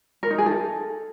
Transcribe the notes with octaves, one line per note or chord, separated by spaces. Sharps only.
A#4
D#4
G#4
A4